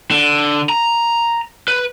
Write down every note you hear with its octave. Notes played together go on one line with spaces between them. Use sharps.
D3
A#5
B4